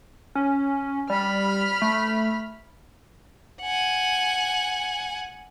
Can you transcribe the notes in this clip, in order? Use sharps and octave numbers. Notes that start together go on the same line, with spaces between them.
C#4
G3 B5 F6
A3
F#5 G#5